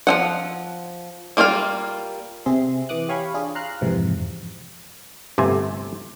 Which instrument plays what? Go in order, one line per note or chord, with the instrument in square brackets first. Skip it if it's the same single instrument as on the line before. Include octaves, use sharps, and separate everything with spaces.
[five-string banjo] F3 D#4 F#5
G3 A#3 F4 C5 F5
[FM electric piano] C3 C4 G#4 E5 C6
E3 D6 D#6 F#6
G4 C#5 F5 G#5 B5 C#6
D4 F4 G#4
F5 A#5 C6 F6 F#6
F2 G#2 C3 E3
[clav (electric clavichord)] G1 C3 A3 G#5